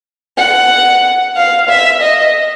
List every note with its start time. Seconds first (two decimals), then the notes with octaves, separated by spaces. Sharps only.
0.38 F#5
1.36 F5
1.69 E5
2.02 D#5